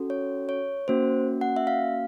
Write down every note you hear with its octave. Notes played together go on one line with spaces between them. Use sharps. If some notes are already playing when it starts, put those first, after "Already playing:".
Already playing: C#4 F#4 A4
C#5
C#5
A#3 C#4 F#4 C5
F#5
E5
F5